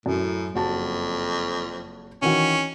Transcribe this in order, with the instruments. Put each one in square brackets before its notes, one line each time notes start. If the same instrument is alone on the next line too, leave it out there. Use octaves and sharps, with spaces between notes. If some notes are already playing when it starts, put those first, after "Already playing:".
[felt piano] F#2 [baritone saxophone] A2
[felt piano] F#1 F#4 A5 [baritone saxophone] F2
[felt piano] D#3 E3 F#4 [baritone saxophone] C#4